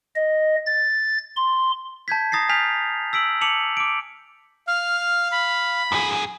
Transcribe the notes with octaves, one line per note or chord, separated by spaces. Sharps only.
D#5
A6
C6
A5 G6 G#6 B6
A#5 D#6 A6 A#6 C7
G#5 F6 G6 B6 C7 F7
E6 B6 D7 F#7
A5 D6 C#7 D#7 F7 F#7
D6 D7
F5 F6
B5
F#2 G#4